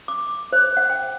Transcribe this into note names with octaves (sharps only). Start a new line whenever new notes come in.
D6
C5
F#5
G5